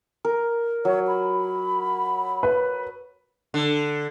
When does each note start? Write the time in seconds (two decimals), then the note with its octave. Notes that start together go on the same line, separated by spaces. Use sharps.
0.25 A#4
0.85 F#3 C#5
1.08 B5
2.43 B4
3.54 D3